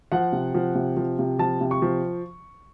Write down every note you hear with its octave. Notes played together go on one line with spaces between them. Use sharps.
F3 F#5
C3
F3
C3
F3
C3
F3 A5
C3
C#6
F3